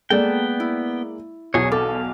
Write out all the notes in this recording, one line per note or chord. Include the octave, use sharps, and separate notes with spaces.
G#3 A#3 B3 A4 D5 G5
E4
B1 E2 B2 G#4 C#5
A4 F5 D6